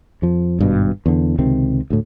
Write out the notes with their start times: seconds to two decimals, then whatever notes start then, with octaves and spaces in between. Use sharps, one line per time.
0.22 F2 F3
0.59 G#1 G2 B2
1.06 E2 D3
1.38 C#2 C3 D#3 C4
1.90 D2 A2